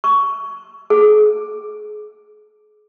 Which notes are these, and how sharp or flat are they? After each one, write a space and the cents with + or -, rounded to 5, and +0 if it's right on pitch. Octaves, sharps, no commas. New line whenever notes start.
C#6 +15
G#4 +35